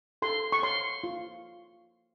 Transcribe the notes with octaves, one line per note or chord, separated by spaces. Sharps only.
A4 C6
C#6
C#5 C6
F4